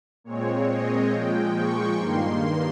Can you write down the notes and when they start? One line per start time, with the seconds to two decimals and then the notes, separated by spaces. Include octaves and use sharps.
0.24 A#2 G#3 C4 C#5
0.68 D#5
1.11 A#2 F3 G#3 G5
1.54 C#6
1.97 G2 D#3 A#3 C6
2.39 C6